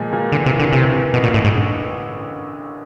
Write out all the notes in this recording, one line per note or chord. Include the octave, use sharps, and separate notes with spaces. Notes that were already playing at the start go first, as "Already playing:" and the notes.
Already playing: A#2 F3 G#3
A#2
D3 E3
C3
A2
D3
C3 E3
E3
A1 B2
A#2
A1 A2
G#2
D3